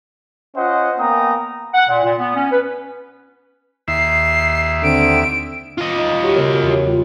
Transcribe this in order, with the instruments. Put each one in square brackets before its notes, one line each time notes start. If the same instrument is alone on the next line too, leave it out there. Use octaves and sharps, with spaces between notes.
[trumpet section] C#4 F4 C5 D#5 F5 F#5
A#3 B3 G5 G#5 A#5 D#6
[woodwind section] F#5
A#2
A#2
B3
C#4
B4
[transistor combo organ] D#2 E5 [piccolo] C7
[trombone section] D3 C4 [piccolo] D7
[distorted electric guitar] F4 D#5
[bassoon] D#4
[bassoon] F#3 [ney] G4
[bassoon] F#2 [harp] C#3 B3 C#5
[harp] E2
[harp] G3 [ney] F4